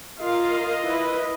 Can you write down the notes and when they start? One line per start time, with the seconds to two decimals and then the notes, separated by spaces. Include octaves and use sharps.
0.20 F4 A#4 D#5 F5
0.83 E4 B4